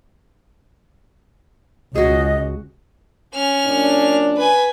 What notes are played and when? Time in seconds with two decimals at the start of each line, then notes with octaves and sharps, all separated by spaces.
1.95 C#2 F#4 G#4 D#5
3.34 C#4 F6
3.65 F#2 A#2 D4
4.37 B4 G#5